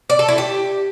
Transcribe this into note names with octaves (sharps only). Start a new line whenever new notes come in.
D5
A4
E4
G4